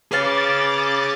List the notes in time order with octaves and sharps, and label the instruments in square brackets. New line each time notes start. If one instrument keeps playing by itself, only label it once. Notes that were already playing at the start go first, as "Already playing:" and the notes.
[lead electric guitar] G#4 C#5 [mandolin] B4 F5 A5 [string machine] D6 A6